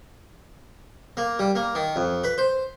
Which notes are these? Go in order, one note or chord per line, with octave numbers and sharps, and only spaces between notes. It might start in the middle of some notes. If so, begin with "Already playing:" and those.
A#3
G3
A#3
D#3
F2
B4
C5